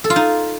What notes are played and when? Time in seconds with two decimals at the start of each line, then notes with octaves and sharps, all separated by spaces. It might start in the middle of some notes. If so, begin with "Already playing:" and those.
0.04 A4
0.10 F4
0.16 D#4